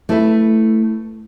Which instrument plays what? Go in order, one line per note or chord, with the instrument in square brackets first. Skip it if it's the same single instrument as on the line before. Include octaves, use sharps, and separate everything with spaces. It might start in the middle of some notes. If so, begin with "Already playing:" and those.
[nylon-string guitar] A3 E4 B4